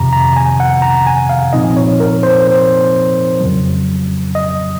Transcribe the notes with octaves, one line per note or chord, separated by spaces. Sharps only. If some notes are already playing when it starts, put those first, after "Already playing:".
Already playing: F2 C3 D#3 A#5
A#5
G#5
F#5
A#5
G#5
F5
A#2 F3 C4 D#4 D#5
C#5
A#4
C5
C5
F2 C#3 F#3
D#5